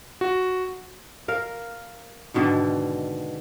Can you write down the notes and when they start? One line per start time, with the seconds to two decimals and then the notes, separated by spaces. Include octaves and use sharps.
0.21 F#4
1.28 A#4 F5
2.34 G#2 B2 D3 D#3